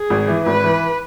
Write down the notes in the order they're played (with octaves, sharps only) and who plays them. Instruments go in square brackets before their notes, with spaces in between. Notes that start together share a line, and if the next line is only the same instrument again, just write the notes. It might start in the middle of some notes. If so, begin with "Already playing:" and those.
Already playing: [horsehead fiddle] G#4
[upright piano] G#1
E3
[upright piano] G#1 [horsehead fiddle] B4
[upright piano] E3